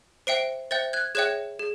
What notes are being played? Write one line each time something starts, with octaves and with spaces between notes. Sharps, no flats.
C5 E5 G5 C7 D7
C5 E5 G5 G6 A6
F#6 G#6
G#4 C#5 E5 G5 F#6 G#6
G#4